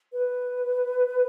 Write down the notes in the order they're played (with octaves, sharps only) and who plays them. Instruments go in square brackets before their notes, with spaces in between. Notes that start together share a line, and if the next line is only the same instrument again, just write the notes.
[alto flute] B4